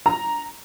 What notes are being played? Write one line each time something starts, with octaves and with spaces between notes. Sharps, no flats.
A#5